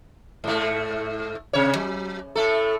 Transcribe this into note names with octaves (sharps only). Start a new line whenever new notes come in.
G#2 A3
C3 C#5
F#3
A2 A3 A4